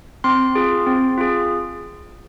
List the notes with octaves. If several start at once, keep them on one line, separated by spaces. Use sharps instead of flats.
C4 C6
F4 G#4
C4
F4 G#4